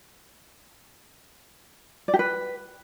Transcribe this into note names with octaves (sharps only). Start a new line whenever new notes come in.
D5
G4
B4